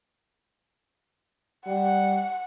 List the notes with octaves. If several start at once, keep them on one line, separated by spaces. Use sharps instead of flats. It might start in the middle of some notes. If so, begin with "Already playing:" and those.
G3 F#5